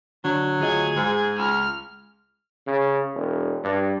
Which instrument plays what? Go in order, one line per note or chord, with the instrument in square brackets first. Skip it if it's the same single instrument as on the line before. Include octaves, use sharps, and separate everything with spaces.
[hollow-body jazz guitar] D3 D4 [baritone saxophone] F#3
[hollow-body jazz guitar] D2 F4 D#5 [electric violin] G#4 G#6
[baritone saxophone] G#2 [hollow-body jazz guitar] G#3
[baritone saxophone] C#2 [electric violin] F6
[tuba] C#3
E1
G2